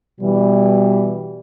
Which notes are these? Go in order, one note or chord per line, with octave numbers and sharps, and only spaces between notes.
B2 E3 G3